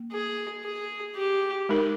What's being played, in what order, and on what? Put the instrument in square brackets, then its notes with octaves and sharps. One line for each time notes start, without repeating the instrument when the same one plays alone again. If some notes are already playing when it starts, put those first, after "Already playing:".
Already playing: [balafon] A#3
[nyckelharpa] G#4
G#4
G4
[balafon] G#3 D#4 A#4